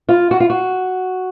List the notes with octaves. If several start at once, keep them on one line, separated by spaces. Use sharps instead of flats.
F4
F#4
F4
F#4